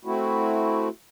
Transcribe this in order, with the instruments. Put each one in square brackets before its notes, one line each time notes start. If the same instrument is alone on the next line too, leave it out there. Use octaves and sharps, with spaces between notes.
[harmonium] A3 C4 E4 F#4